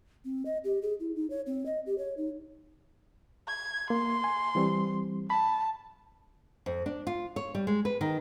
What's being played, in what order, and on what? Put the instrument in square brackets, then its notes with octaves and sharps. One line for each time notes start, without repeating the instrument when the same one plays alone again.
[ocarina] C4
D#5
G4
G#4
E4
D#4
C#5
C4
D#5
G4
C#5
D#4
[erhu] G#6
[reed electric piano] A#3 [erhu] C6
[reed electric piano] G#5
E3 G3 C4
[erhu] A5 [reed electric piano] B5
[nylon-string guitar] F2
D4
F4
C#5
G3
G#3
B4
D#3